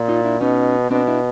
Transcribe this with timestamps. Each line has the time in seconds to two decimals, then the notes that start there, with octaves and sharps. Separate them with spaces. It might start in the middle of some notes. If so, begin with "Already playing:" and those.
Already playing: A#2
0.08 D#4 F4
0.24 D4 E4
0.40 B2 C#4 D#4
0.91 B2 C4 D4
1.07 D4 E4